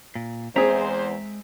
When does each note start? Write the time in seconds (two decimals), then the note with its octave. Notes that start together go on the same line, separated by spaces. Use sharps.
0.15 A#2
0.56 E2 G#3 C4 G#4 C5 E5 A#5